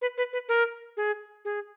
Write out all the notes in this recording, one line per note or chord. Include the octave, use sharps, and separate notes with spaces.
B4
B4
B4
A#4
G#4
G#4